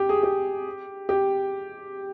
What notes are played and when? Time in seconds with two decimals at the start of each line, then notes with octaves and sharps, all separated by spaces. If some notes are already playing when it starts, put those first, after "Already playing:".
Already playing: G4
0.09 G#4
0.23 G4
1.09 G4